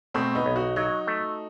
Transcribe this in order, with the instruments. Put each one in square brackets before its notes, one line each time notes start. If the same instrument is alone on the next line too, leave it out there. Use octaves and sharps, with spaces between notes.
[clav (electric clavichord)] B2 [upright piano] A3 C4
[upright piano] B3 D#4
[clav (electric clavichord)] B1
[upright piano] D#4 F#4
[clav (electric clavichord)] F#3 [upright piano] D#4 F#4
[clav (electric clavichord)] A3